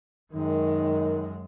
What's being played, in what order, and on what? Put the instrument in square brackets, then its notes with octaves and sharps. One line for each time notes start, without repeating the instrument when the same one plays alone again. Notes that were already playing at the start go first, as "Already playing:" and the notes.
[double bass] F#2 G#3 [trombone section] D#3